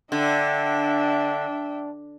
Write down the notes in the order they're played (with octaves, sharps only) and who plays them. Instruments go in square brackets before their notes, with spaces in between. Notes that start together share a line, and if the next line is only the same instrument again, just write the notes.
[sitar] D3 [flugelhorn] D4 [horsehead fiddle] E5 G5